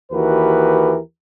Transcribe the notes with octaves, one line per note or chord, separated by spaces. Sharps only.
D#2 E3 F#4 G4 A#4 B4